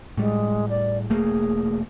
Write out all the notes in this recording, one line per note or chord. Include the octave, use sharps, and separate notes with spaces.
A2 G3 G#3
D5
E1 A3 A#3 G#4